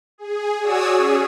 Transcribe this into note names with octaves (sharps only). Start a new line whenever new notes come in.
G#4
F#4 C#5 D5 G#5 D#6 E6
C#4 G#4